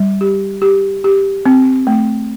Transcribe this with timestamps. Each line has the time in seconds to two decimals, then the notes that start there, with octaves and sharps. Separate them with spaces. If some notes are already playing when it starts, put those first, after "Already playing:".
Already playing: G3
0.21 G4
0.62 G4
1.04 G4
1.46 C4
1.87 A3